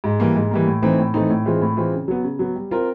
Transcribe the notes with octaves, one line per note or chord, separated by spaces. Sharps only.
G#2
E3 G3 A#3
G#2
E3 G3 A#3
A2
E3 A3 C4 D#4
A2
E3 A3 C4 D#4
A2
E3 G#3 C4 F4
A2
E3 G#3 C4 F4
C#3
F#3 B3
C#3
F#3 B3
G3
C4 F4 A#4